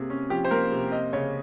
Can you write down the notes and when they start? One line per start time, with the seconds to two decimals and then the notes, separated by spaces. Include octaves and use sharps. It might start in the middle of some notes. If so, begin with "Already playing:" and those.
Already playing: C3 A#3 G#4
0.10 C#4
0.30 F3 G4
0.45 C5
0.51 A#3 A#4
0.72 C3
0.92 C4 D#5
1.13 C#3 C#5